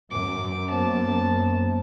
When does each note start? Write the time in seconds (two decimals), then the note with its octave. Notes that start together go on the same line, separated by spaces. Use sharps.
0.10 F#2 D6
0.70 A#3 B3 C5 A5